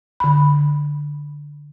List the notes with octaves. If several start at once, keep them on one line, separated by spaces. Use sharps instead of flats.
D3 B5